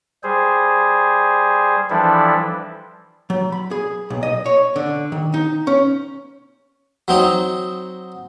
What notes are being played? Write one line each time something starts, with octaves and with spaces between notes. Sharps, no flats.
G3 G#4 C5
E3 F3 G3 D4 E4 A4
F#3
B5
G#4
B1
D#5
C#5
D3
D#3
D#4
C#4
F#3 C4 D#4